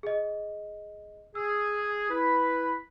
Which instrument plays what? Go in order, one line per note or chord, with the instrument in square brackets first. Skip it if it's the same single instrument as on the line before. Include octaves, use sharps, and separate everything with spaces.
[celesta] G#4 D#5
[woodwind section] G#4 [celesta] E6
[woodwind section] E4 B4 B5